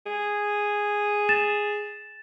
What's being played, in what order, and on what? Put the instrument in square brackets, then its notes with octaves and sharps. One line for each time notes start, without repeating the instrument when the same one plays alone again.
[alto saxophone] G#4
[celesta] A6 E7